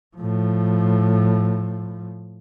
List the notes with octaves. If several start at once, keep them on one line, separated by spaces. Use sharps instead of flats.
A2 F3